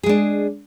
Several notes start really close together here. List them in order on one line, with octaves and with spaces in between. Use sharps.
G#4 G#3 D4